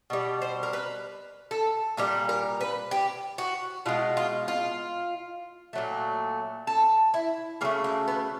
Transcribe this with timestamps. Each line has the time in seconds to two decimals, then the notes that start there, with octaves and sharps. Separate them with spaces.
0.10 B2 G3
0.42 C5
0.63 A#4
0.73 B4
1.51 A4
1.97 A#2 G3 A#4
2.29 A#4
2.61 B4
2.91 G4
3.38 F#4
3.86 B2 G#3 F4
4.17 F4
4.48 F4
5.73 A#2 F#3 A3
6.67 A4
7.14 E4
7.61 C#3 F#3 A3 A#3
7.84 A#3
8.08 B3